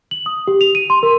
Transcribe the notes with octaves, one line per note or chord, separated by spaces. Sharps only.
F#7
D#6
G4
F7
D#7
C6
A#4